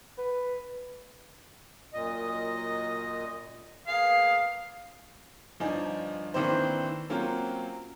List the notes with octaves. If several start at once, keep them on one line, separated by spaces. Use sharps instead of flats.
B4
F#2 A#2 D#5
A#3 B3 G#4 F5
G1 F3 D4 D#4 G#5
D#3 E3 A#3 C4 D4 C5
F#3 A#3 C4 C#4 F4